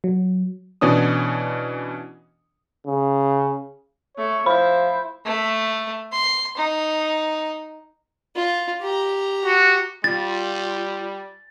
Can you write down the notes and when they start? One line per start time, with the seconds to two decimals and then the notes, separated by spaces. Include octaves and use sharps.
0.04 F#3
0.81 B2 E3 C#4 D4 D#6
2.86 C#3
4.17 A3 C#5
4.46 F3 E4 C5 B5
5.25 A3
6.12 C6
6.57 D#4
8.36 F4
8.82 G4 A#5
9.45 F#4
10.04 G3 F4 A6